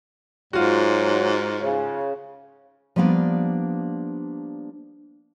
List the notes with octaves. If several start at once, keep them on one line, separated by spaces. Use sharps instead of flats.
G#2 F#3 F4 F#4
C#3
F3 G3 A#3 B3 D4